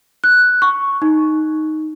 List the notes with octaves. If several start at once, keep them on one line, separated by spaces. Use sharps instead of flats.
F#6
C#6
D#4